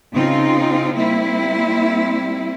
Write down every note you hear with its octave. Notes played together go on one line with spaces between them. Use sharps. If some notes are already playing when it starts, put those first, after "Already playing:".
C#3 C4 D#4 F4
G3 A#3 C4 E4